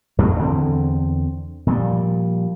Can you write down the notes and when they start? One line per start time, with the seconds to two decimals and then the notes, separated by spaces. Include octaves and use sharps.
0.18 F2 A2 C#3 F#3
0.39 E2 D3 C4
1.67 A#2 F3 G3